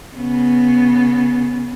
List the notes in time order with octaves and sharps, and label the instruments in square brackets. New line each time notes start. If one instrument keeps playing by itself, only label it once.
[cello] C#3 B3